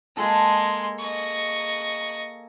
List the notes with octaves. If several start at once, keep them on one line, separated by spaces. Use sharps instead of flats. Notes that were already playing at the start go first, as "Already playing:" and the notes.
G#3 A#3 G#4 A4 C6
D#5 C#6